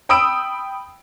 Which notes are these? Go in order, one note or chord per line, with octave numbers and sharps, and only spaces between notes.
G5 B5 D#6 E6 D7